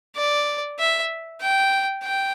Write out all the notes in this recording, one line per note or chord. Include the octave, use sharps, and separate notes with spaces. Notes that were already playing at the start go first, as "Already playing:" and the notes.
D5
E5
G5
G5